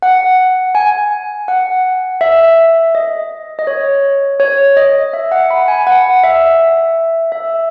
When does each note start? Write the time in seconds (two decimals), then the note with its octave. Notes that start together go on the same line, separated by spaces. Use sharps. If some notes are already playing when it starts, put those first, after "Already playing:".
0.02 F#5
0.75 G#5
1.48 F#5
2.21 E5
2.95 D#5
3.59 D#5
3.67 C#5
4.40 C#5
4.77 D#5
5.13 E5
5.32 F#5
5.51 B5
5.68 G#5
5.87 F#5
6.24 E5
7.32 E5